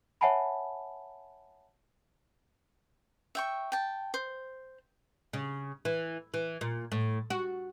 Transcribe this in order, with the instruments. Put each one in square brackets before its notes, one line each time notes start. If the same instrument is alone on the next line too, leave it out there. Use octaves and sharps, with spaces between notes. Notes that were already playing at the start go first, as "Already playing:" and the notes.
[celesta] C#5 E5 F#5 G#5 A5 B5
[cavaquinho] E5 G5 C#6
G5 A5
C5
[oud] C#3
E3
E3
A#2
A2
F#4